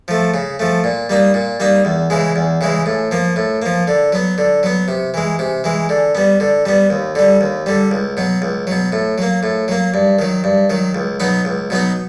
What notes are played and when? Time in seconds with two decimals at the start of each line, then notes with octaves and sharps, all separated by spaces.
0.08 F3 A3
0.34 C#3
0.59 F3 A3
0.84 A#2
1.10 G3 A#3 D#4
1.34 A#2
1.60 G3 A#3 D#4
1.85 E2
2.10 C#3 E3 G#3
2.36 E2
2.61 C#3 E3 G#3
2.86 A2
3.11 F3 A#3
3.36 A2
3.62 F3 A#3
3.88 D3
4.12 F#3 B3
4.38 D3
4.63 F#3 B3
4.88 C3
5.14 E3 G#3
5.39 C3
5.64 E3 G#3
5.89 D3
6.15 G3 B3
6.40 D3
6.65 G3 B3
6.90 D#2
7.15 D3 G3
7.41 D#2
7.66 D3 G3
7.91 C#2
8.17 B2 F#3
8.42 C#2
8.67 B2 F#3
8.92 A2
9.18 F#3 A#3
9.43 A2
9.68 F#3 A#3
9.94 G2
10.19 D#3 F#3
10.44 G2
10.70 D#3 F#3
10.95 C#2
11.20 B2 F#3 B3 D#4
11.45 C#2
11.70 B2 F#3 B3 D#4